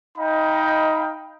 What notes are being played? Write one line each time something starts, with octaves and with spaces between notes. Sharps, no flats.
D#4 D#5 F5 G5 B5